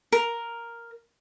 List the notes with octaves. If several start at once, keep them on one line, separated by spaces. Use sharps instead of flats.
A#4